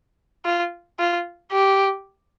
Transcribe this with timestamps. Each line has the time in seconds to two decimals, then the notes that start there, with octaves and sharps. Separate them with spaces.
0.45 F4
0.99 F4
1.52 G4